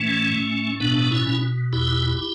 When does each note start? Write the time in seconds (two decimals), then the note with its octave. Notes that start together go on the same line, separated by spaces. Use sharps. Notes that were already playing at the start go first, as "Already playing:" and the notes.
Already playing: A2 E3 A3 C#4
0.34 A2
0.80 B2 B3 D4
1.11 C#4 E4
1.26 B2
1.73 E2 E4 G4